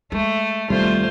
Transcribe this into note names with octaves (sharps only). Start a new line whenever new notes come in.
G#3 A3
D#2 C3 G3 A3 F4 C5